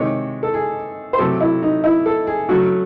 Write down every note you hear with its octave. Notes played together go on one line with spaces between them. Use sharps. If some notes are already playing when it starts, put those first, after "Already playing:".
Already playing: C3 D#3 G#3 C#5
A4
G#4
C5
C3 F#3 A3 A4
E4
D#4
E4
A4
G#4
C#3 F#3 A3 F#4